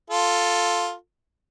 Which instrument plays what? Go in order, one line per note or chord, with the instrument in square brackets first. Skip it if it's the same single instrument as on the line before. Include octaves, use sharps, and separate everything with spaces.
[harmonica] F4 A4